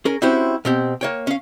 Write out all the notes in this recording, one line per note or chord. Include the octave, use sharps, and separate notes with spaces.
C#4 G#4 A#4
C4 C#4 E4 F#4 G4 C5
B2 C4 G4
A#3 C#5 G5
C#4 F5